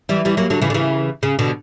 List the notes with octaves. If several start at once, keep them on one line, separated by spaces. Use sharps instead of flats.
E3 G3
E3 G3
F#3 A#3
D3 F#3
C#3 E3
D3
C#3 E3
C#3
B2 D3